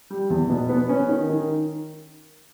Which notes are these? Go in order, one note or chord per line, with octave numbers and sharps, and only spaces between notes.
G3
E2
B2
B3
C#4
D#3
D#3